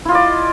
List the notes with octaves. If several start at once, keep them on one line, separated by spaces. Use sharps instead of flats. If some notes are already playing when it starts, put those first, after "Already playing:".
E4 F4 D5 D#5